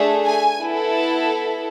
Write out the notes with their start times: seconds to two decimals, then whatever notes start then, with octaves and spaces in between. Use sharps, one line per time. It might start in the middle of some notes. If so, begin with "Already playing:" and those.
Already playing: A3 D4 G#4
0.25 G#5
0.59 B3 E4 A4
0.93 A5